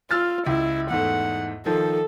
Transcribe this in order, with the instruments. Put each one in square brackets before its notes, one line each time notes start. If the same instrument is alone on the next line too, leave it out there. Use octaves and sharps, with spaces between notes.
[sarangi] F4 [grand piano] E6 F6 A6
[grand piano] C#2 [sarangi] E4
[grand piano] E2 G#2 A3 [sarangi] F#5
[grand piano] D#3 F3 F4 [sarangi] A4